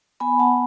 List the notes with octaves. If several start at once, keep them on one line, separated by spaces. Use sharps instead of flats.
B3 G#5 B5
B3 F#5 A5